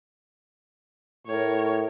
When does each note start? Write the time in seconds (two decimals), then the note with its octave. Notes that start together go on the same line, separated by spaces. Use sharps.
1.27 A2 A#4 C#5